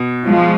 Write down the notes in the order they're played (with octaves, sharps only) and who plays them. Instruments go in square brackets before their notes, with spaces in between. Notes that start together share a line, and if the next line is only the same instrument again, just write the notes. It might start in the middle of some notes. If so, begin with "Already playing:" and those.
Already playing: [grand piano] B2
[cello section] F3 G#3